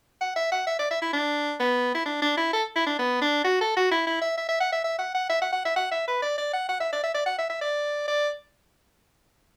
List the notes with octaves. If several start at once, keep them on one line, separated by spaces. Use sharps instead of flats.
F#5
E5
F#5
E5
D5
E5
E4
D4
B3
E4
D4
D4
E4
A4
E4
D4
B3
D4
F#4
A4
F#4
E4
E4
E5
E5
E5
F#5
E5
E5
F#5
F#5
E5
F#5
F#5
E5
F#5
E5
B4
D5
D5
F#5
F#5
E5
D5
E5
D5
F#5
E5
E5
D5
D5